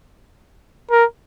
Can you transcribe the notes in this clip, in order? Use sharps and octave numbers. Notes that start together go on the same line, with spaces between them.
A#4